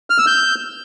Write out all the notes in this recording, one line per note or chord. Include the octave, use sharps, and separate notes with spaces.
F6
E6
G6